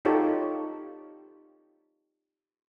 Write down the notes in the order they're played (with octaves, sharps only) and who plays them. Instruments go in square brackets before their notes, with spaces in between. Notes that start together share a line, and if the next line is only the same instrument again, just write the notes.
[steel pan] D#4 F4 G4 A4 C#5